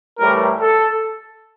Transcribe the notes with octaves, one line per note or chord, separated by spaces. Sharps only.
A2 E3 G3 A#4
A4